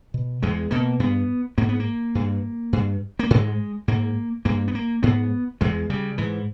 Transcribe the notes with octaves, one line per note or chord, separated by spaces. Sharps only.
B2
E2 G#3
B2 A#3
G2 B3
G#2 A#3
B3
A#3
G2
G2
A#3
G#2 G#3
G#2 A#3
G2 A#3
B3
A#3
G#2 B3
E2 G#3
C#3 G3
G#2 E3